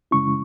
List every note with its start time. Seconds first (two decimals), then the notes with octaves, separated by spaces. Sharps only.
0.11 F#2 C#3 G#3 C#4 E4 C#6